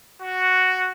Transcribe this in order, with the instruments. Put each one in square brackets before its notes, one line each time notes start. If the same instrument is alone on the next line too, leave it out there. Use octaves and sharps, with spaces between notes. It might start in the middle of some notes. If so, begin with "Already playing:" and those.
[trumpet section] F#4